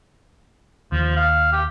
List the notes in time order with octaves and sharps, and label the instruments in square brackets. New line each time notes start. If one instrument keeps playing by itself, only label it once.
[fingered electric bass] D#2 [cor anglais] F3
[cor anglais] F5
G4